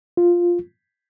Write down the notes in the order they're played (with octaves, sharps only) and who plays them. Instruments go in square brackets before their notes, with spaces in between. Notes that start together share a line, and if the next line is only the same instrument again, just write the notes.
[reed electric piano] F4